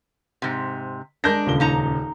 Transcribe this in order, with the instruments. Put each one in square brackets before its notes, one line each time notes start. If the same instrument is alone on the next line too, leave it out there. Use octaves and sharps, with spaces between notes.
[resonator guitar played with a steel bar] G#2 C3
[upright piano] G#3 G6 A#6 [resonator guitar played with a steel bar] D4 A#4
[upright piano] D#1 C#2 G7
[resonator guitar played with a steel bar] A#3 D#4 A#5